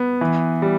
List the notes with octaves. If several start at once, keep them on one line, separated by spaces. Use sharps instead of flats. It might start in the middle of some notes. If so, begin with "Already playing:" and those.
Already playing: B3
E3
G3